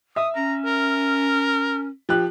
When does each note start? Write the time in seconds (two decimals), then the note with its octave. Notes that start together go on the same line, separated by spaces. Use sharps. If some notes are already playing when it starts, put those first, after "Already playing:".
0.16 E5 D#6
0.35 C#4 A#5
0.65 A#4
2.09 F3 G4 F#6